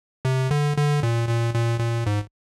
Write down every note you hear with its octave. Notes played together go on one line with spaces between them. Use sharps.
C3
D3
D3
A#2
A#2
A#2
A#2
G#2